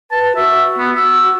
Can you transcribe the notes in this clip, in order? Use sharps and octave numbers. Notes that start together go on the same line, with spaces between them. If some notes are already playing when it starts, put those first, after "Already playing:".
B4 A5
F#4 E5
B3
F#4 E6